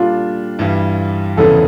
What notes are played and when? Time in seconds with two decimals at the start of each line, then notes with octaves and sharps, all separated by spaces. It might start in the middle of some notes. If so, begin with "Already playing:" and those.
Already playing: A#2 G3 D4 F4 A4
0.59 G2 E3 G3
1.36 F1 E2 C#3 E3 A4